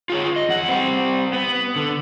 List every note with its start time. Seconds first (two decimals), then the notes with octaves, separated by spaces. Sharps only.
0.10 F4 G#4 C#5
0.36 D#5
0.49 E2 F#5
0.69 G3 C4
1.33 B3
1.76 D3